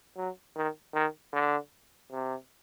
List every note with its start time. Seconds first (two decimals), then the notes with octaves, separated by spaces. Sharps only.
0.17 F#3
0.56 D#3
0.94 D#3
1.33 D3
2.11 C3